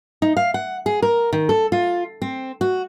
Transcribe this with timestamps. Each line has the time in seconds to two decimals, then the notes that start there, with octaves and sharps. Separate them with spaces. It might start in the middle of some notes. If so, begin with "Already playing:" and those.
0.22 D#4
0.37 F5
0.54 F#5
0.86 G#4
1.02 A#4
1.33 D#3
1.49 A4
1.72 F4
2.22 C4
2.61 F#4